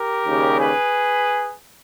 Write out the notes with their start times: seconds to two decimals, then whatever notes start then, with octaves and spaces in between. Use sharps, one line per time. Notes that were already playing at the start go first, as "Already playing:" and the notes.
Already playing: G4 A#4
0.27 D#2 C#3 G3
0.59 G#4 B4